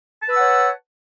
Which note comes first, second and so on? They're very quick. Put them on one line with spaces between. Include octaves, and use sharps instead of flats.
A5 B4 E6 F#5 C#5